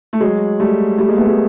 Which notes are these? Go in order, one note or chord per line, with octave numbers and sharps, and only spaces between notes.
A3
F#3 G#3
G3 A3
G3 A3
G#3 A#3
A3 B3
G#3 A#3